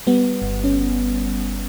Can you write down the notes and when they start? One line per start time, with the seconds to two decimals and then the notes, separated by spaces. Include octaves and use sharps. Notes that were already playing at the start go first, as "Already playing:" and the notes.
0.07 G3 B3
0.42 G1
0.64 C#4